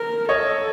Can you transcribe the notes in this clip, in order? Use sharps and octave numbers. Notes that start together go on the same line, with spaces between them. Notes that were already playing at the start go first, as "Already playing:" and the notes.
Already playing: A#4
A4 C#5 D#5